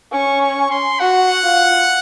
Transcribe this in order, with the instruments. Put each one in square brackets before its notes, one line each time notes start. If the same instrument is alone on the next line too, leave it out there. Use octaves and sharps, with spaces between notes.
[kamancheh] C#4 [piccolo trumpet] C#6
[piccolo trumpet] C#6
C6
[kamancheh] F#4 [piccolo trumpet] F#5
[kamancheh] F4